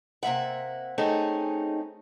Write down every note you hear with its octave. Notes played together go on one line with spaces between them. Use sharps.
C3 A#3 E5 F#5
A3 C4 C#4 D#4 G#4